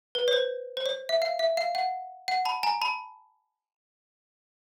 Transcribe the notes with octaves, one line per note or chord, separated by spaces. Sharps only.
B4
C#5
C5
C5
C#5
E5
F5
E5
F5
F#5
F#5
A5 B5
G#5 A#5
A5 B5